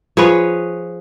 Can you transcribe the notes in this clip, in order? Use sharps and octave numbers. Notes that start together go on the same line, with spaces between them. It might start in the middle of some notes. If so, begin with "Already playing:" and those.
F3 G#4 B4 C#5